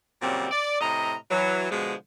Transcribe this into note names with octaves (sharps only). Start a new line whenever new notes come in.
A#2 C#3 F#3 G3 C4
D5
A2 C3 D#5 A#5
E3 F#3
B2 D3 F3 G#3